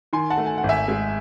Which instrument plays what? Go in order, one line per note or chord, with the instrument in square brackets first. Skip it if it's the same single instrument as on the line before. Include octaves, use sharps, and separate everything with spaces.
[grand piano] D#3 G#5 C6
F#5 A5
A3
G#5
F#5
G#1
E5 G#5
G#3